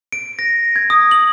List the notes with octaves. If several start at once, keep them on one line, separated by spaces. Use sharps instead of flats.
D7
A#6
G#6
D#6
F#7